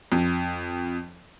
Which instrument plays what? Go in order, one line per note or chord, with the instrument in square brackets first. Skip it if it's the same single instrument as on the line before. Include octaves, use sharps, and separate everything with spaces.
[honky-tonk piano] F2